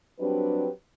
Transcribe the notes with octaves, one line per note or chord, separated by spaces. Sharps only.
F#3 G3 C4 D4 G4 B4